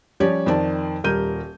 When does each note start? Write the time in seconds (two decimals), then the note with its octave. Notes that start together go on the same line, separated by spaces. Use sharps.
0.20 F3 G3 C#4 G4 C#5 D5
0.46 F2 D#3 C5 D5 A5
1.04 D#1 G3 A#4 G6 D#7